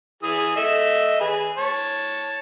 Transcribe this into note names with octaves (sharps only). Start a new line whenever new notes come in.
E3 G#4 D#6
A3 D#5 E5
G#4 B4
C#5 A5